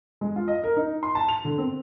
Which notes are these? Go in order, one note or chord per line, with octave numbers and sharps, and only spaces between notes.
G#3
F4
D#5
A#4
D#4
C6
A5
F7
D3
C4